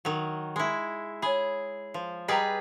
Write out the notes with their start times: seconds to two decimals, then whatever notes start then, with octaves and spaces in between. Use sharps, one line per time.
0.05 D#3 F#3
0.56 G#3 E4
1.22 G#4 C#5 G#5 B5
1.94 F3
2.28 G3 G#4 B4 D#5 G5 A#5